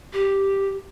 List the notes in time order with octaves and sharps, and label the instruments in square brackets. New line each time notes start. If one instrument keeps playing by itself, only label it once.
[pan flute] G4